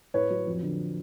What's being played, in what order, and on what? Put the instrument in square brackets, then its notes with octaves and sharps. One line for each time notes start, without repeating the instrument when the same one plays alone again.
[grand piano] A2 B4 C#5
F#3
F2
D3